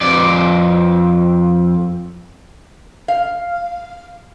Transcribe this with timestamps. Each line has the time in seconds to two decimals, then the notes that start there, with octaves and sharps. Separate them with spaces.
0.01 F2 D5
3.08 F5